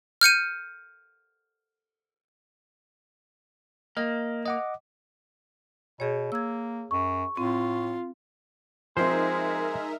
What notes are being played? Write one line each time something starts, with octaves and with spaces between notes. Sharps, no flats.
F6 G6 C#7 D#7
A#3 D#5 F6
D#5 F#5 D6
B2 G#4 C#5
A#3 E6 G#6
F#2 C#6
A2 C4 F4
F3 G#3 C4 D#4 A#4 C5 E5